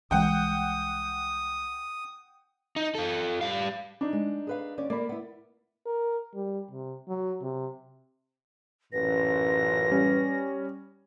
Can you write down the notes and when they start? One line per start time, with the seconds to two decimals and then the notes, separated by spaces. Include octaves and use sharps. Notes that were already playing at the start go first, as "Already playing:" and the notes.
0.11 C2 E3 G#3 F#5 G5 D#6
2.76 D#4
2.95 F4 A4
3.41 G3 F5
4.01 D4 D#4
4.13 G#3
4.47 G#4 B4 F5
4.78 D#2 C#4 D5
4.90 A#3 A#4 D5 B5
5.09 B3 E4
5.86 A#4
6.34 G3
6.71 C3
7.08 F#3
7.42 C3
8.93 A1 F#2 A#2 B4 A#6
9.91 G3 C#4